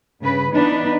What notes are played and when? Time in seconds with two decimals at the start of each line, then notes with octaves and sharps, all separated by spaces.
0.20 G2 C#3 B4
0.52 E3 B3 D4 D#4 B4